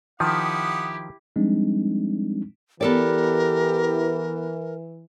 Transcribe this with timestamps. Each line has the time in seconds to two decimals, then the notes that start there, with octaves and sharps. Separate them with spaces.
0.20 D#3 F3 E4 G4 F#5 D#6
1.36 F3 G3 G#3 C4 D4 D#4
2.81 E3 B3 G4 A4 A#4 D5